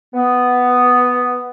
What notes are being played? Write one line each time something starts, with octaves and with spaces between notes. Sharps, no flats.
B3